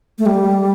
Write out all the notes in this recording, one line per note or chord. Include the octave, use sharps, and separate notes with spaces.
A3
G3